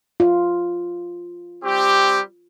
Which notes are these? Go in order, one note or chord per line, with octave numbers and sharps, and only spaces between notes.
F4
G3 C4 G4